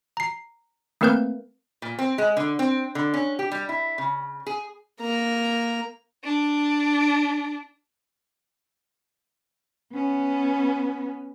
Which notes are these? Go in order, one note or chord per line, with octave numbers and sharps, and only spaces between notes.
A#5 C7
A3 A#3 C4 A#4 B4 G6
A#2
C4
G#3
D3
C4
D3
C#4
G4
G3
E4
C#3
G#4
A#3 A#5
D4
B3 C#4